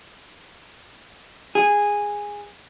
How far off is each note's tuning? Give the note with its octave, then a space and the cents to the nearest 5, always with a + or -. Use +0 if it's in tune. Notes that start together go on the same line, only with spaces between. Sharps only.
G#4 -10